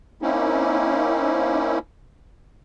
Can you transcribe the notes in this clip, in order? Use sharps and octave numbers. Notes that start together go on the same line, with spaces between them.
A#3 C4 C#4 D#4 E4